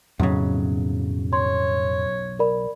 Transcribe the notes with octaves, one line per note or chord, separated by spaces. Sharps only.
B1 F2 A2 C#3 F#3
C#5 C6
A#4 D5 B5